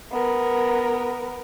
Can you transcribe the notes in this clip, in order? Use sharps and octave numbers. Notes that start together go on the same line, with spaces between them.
B3 A#4